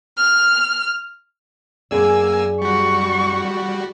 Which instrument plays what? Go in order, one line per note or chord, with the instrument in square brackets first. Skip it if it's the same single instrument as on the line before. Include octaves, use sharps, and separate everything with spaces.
[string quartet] F6
[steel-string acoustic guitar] F#2 G#4 D5 [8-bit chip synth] A#3 G#5 E6
[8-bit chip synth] G3 F#4 [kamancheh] C#6